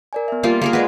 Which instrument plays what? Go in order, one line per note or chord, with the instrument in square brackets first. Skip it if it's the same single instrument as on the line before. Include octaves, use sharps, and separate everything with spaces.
[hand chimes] A#4 D5 G#5
B3 E5
[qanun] G3 A#3 F4
A#3 G#4 A#4
[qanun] G#3 B4 [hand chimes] D5 D#5 F#5